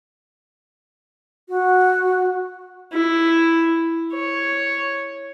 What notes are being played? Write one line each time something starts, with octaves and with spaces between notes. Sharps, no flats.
F#4
E4
C#5